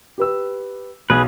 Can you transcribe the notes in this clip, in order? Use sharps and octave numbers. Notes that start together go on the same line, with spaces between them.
G4 B4 E6
B1 G#4 B4